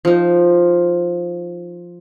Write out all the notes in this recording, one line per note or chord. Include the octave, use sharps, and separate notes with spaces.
F3 D#4